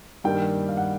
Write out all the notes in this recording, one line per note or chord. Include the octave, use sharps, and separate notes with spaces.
G2 D#3 G3 A#3 G5
F5
F#5